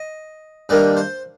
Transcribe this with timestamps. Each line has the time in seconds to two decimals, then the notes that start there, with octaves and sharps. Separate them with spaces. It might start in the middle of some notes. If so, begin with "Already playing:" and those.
Already playing: D#5
0.69 G2 D#3 G3 A#3 D4 D5
0.97 C5